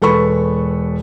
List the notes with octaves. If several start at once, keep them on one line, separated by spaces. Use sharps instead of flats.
E1 A4 B4 B5 C#6